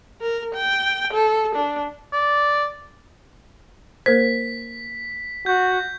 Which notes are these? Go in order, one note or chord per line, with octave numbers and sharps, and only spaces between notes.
A#4
G5
A4
D4
D5
A#3 A#4 C5 B6
F#4 G6